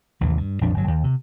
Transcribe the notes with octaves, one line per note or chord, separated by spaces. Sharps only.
A1 D#2 C3 E3
G2
A#1 F2 D4
G1 F#3
D#2
C3